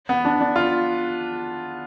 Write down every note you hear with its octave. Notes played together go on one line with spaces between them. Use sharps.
B3
D4
D4
F4